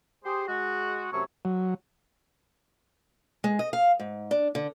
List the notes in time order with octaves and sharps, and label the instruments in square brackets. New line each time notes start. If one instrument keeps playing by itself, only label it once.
[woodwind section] G4 G#4 C5
G#3 F#4
F#2 C3 F#3 A3 C#5 C#6
[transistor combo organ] F#3
[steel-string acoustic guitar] G#3
D#5
F5
G#2
D4
D3